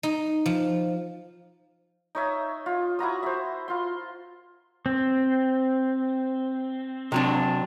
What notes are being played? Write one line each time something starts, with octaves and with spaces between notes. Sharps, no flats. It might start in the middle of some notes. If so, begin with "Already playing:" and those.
D#4
F3
D#4 C#5 E5
F4
E4 F#4 A#5 D#6
C5 E5
F4 C6
C4
C3 F#3 D4